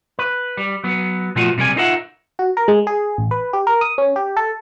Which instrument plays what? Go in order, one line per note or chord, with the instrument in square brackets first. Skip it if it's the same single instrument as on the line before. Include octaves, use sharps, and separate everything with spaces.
[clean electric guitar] B4
G3
F#3 B3
A#2 F3 A3 B3 F4 F#4
B1 C3 G3 A#4 G#5
D#4 F4 A#4 E5 F#5
[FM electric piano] F#4
A#4
G#3
G#4
A1
B4
G4
A#4
D#6
C#4
G4
A4